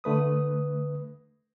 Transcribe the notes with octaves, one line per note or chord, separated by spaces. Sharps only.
D3 A3 B4 D#6